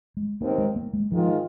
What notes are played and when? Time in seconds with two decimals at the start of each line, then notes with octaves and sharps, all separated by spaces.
0.17 G#3
0.40 D#2 D#3 A#3 C4 D#4
0.58 G#3
0.76 A#3
0.93 G#3
1.11 G#2 D#3 F3 G#3 F4